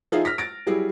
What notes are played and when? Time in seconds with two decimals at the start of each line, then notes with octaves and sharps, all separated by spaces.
0.12 F3 D#4 F4 G#4 E5
0.25 F6 A#6 B6
0.38 A6 A#6 D7
0.67 F#3 G3 E4 G#4